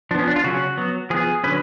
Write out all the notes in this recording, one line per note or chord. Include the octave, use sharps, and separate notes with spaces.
F3 B3 C#4 D4
D4
F4
C#3 F#3 C#4 F#4
F#3 B3
F3 B3 G#4
D3 F#3 C#4 B4